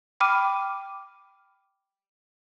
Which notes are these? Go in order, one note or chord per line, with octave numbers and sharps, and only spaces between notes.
G5 B5 D6 F6 D#7